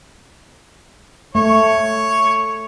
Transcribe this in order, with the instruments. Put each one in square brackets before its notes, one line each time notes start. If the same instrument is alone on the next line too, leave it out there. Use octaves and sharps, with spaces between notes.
[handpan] A3 [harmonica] C#5 C#6